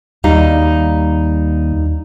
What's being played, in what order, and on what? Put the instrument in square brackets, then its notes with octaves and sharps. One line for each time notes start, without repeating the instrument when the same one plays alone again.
[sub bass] D#2 [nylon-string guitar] G3 D#4 F5